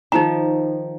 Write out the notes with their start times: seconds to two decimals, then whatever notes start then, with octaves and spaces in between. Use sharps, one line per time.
0.12 D#3 F3 D#4 A#5